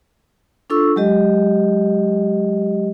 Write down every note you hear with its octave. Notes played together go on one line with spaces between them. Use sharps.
D4 F4 A4 C#6 E6
F#3 G#3 G4 D#5